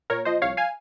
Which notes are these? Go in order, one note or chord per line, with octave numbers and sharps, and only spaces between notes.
A#2 A#4 C#5
F3 C5 D#5
C2 C#5 F5
F5 G#5